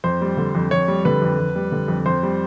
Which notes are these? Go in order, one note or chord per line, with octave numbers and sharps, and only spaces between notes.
F2 C5
G3
D3
F2
F2 C#5
G3
D3 B4
F2
F2
G3
D3
F2
F2 C5
G3